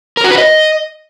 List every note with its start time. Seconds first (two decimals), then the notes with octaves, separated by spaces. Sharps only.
0.17 A#4
0.24 F#4
0.31 B4
0.38 D#5